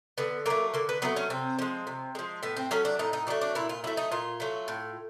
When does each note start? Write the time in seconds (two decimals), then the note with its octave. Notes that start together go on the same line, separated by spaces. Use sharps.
0.18 D3 B3
0.46 F#3 A3 A#3
0.74 D3 A#3
0.89 B3
1.02 F#3 A3 B3
1.16 C#4
1.30 C3 C4
1.59 F3 G#3
1.87 C3
2.15 F3 G#3
2.43 A2 B3
2.57 C4
2.71 F#3 A3 C#4
2.85 D4
2.99 A2 D#4
3.13 D#4
3.27 F#3 A3 D4
3.41 D4
3.55 A#2 E4
3.69 F4
3.84 F#3 A3 E4
3.97 D#4
4.12 A#2 F4
4.40 F#3 A3
4.68 A2